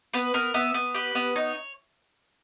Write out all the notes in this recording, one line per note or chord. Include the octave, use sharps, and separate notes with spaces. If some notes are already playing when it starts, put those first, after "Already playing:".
B3 B4
B3 A#4
B3 E5
B3
G4 B4
B3
D#4 C#5